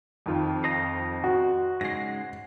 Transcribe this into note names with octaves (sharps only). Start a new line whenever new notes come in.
F2 D#3 F4
C5 D#5 A#5
F#4
G#2 C#3 G#3 A#6 C7